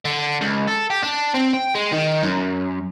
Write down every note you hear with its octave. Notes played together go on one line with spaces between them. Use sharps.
D3
C#2
A4
G4
D4
C4
G5
G#3
D#3
F#2